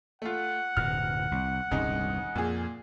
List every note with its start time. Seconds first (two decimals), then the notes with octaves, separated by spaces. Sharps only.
0.22 A3 F4 F#5
0.77 D1 F#2 B2 F6
1.31 C2
1.71 D#1 C2 G2 C#3 D#4
2.36 F2 A#2 G#4